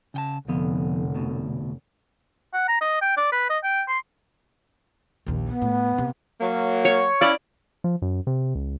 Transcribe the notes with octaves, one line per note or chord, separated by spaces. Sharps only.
C#3 G5 A5
F1 D3 F3 B3
D2 B2
F#5
A#5
D#5
G5
D5
B4
D#5
G5
C6
A#1 D#2
B3
A2
C3
F#3 A#3
C#5
C#4 E4 D5 F5
F3
F#2
C3
C#2